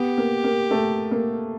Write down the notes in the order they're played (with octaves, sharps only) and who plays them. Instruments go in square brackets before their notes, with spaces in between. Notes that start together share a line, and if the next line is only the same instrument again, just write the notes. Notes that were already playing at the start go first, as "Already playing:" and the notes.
Already playing: [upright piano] B3 [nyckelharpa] G4
[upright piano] A#3
A#3
A3
A#3